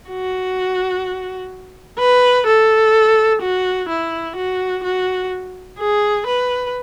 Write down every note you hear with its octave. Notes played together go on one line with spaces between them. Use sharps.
F#4
B4
A4
F#4
E4
F#4
F#4
G#4
B4